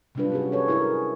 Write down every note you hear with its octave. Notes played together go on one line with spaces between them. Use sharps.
C3 F#3 G3 D4 F4 B4
C#4 F#4 G#4
A4 B4 C#5
E4 G#4 A#4